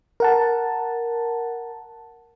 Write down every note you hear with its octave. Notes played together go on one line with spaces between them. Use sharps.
A#4 F#5 A5